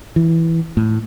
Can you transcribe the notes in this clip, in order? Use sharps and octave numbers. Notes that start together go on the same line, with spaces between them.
E3
A2